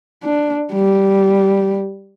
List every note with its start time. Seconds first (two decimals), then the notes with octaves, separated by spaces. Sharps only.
0.23 D4
0.73 G3